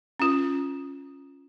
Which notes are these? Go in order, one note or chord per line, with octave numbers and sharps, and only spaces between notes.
C#4 F4